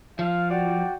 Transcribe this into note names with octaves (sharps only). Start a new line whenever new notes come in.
F3 F5
F#4 D5 G5